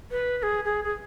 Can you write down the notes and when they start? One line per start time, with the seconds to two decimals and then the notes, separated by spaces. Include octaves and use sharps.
0.11 B4
0.38 B4
0.43 G#4
0.65 G#4
0.84 G#4